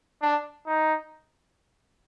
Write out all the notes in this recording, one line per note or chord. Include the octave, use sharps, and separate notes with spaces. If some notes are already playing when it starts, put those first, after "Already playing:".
D4
D#4